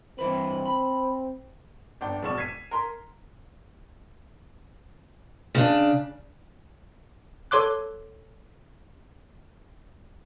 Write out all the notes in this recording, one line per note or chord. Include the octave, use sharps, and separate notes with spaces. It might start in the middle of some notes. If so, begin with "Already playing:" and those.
G2 E3 C4 B4
B5
G1 D4 G5
E1 B2 D5 C#6 E7
G#6 B6 C7 D#7
A#4 C6
C#3 D4
A4 C#5 C6 D6 F#6